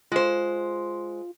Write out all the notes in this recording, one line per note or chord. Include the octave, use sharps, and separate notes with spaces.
G#3 F4 C5